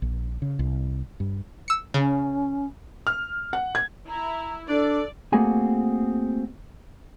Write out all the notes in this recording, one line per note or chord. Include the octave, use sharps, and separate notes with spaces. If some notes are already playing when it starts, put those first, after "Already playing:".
A#1
C#3
C2
G2
E6 C#7
C#3 C#4
F6
F#5
G#6
E4 A#5
D4 A4 D5
A3 A#3 C4 F#4 G#4 G#5